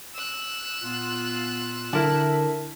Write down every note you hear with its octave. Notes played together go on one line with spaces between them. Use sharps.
E6 F#6
A#2 B3 F4
D3 E4 A#4 E5 A5